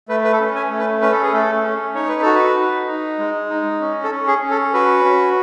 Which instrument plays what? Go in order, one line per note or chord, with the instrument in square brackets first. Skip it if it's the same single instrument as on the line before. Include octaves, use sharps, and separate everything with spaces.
[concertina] A3 B4
B4
A4
C#4
G#5
A3
B4
C#4 B4
A4
G#4
A3 A4
C#4
D#4 C#5
B4
F#4 A4
B4
D#4
D#4
G#3
D#4
C#4
A4
C#4
G#4
C#4
A4
F#4 B4
C#4